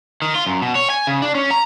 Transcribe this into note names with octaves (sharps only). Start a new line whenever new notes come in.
D#3
F4
F#2
B2
C#5
G#5
C#3
D4
C#4
A#5